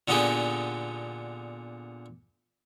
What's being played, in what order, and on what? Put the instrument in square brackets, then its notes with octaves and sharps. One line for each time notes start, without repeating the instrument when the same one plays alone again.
[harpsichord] A#2 D3 B3 D#4 G4 G#4